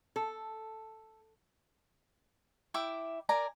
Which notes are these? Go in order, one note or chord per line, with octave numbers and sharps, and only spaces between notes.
A4
E4 E5 G5 D6
A#4 D5 G#5 A#5